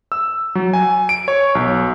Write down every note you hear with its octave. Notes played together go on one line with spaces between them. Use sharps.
E6
F#3
G#5
D7
C#5
B1